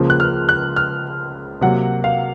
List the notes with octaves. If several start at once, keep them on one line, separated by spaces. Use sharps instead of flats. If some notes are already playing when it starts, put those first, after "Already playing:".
Already playing: C#2 C#3 F3 A#3
F#6
F6
F#6
F6
C3 F#3 A#3 F#5
F5